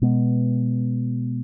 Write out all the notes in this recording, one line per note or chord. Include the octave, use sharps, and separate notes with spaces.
B2 G#3 B3